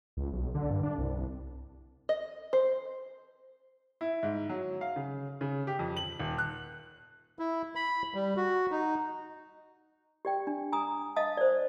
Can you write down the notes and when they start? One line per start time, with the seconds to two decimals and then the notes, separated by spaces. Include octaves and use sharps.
0.17 C#2
0.32 B1
0.55 D3
0.70 G2
0.83 D4
0.99 C2
2.09 D#5
2.53 C5
4.01 E4
4.23 G#2
4.49 F#3
4.81 F5
4.96 C#3
5.41 C#3
5.67 G4
5.79 F2
5.97 F#7
6.20 D#1
6.38 F#6
7.39 E4
7.76 B5
8.14 G3
8.37 F#4
8.71 D#4
10.25 G4 D5 G5
10.47 D4
10.72 G#5 A#5 D#6
11.16 D#5 F5 A5 D#6
11.37 C5 D5